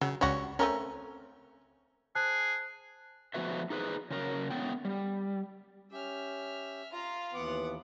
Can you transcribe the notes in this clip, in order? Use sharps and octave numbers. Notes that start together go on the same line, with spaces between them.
C#3 F#3
C#2 G3 C#4 F#4
A3 C4 C#4 A#4
G#4 C5 A5 F#6
F3 A3 B3 F#4 B4 E5
D#4 G#4 B4 C5
C#3 F#3 A#4
A3 B3 C#4 G5
G3
C#4 G4 E5 F6
F4 F5 A#5
D#2 E3 B3 F#5 D6